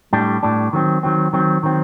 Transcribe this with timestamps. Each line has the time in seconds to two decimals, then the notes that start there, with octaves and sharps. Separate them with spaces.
0.13 A2 G3 D4
0.43 A2 G3 D4
0.73 D#3 F#3 C4
1.03 D#3 F#3 C4
1.33 D#3 F#3 C4
1.63 D#3 F#3 C4